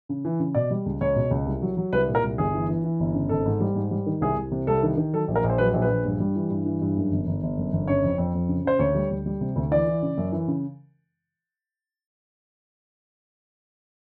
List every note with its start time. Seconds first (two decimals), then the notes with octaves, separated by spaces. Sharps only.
0.09 C#3
0.25 E3
0.39 C#3
0.55 B2 D5
0.71 G3
0.86 C#2
1.01 C#2 C#5
1.16 B2
1.31 C#2
1.46 C2
1.62 F#3
1.77 F#3
1.92 C2 B4
2.08 A#2
2.15 A#4
2.23 C2
2.38 G1 G#4
2.54 E3
2.69 E3
2.84 E3
3.00 G1
3.14 C#3
3.29 G#1 A4
3.45 G#2
3.60 G3
3.75 G#2
3.91 G3
4.06 D#3
4.21 C2 G#4
4.36 C2
4.52 C3
4.67 C2 A4
4.83 D#3
4.97 D#3
5.13 F#3 A4
5.28 A#1
5.36 A#4
5.44 A#1
5.50 C5
5.58 F#3 B4
5.74 A#1
5.82 B4
5.90 A#1
6.04 G2
6.20 G3
6.36 E3
6.50 G2
6.66 E3
6.82 G2
6.97 F#2
7.12 G1
7.27 G1
7.43 G1
7.57 F#2
7.73 G1
7.87 C#3 C#5
8.03 F2
8.18 F2
8.34 F2
8.48 C#3
8.65 C#3 C5
8.79 D2 C#5
8.95 G3
9.11 D2
9.26 G3
9.41 C3
9.56 D2
9.71 E3 D5
9.87 E3
10.02 C#3
10.17 F#2
10.32 E3
10.48 C#3